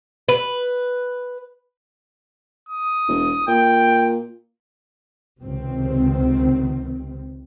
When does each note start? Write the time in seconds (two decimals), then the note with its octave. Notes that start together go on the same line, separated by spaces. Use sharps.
0.29 B4
2.69 D#6
3.08 E1
3.48 A#2 G5
5.42 C#2 C3 D#3 C4